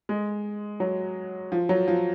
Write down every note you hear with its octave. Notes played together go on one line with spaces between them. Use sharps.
G#3
F#3
F3
F#3
F3